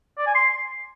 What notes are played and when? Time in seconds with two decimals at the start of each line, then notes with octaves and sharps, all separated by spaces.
0.18 D5
0.26 G#5
0.35 C6